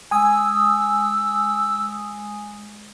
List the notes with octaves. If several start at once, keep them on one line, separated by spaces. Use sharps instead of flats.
G#3 G#5 D#6 E6